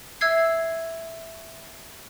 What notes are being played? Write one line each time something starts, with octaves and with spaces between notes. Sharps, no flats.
E5 E6 G#6 C7